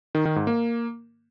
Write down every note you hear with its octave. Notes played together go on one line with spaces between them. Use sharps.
D#3
D#3
G#2
A#3